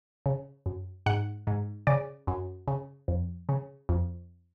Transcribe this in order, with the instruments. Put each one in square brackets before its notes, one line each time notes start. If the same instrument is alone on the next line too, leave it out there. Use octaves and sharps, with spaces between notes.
[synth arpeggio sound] C#3
F#2
G#2 F#5
G#2
C#3 D5
F#2
C#3
F2
C#3
F2